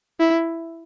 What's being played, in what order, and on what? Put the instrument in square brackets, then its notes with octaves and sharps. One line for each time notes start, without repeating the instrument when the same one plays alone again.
[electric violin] E4